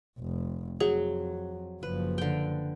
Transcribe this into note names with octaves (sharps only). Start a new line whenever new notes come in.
F1
F2 F#3 G#4
F#1 F3 B4
D3 G5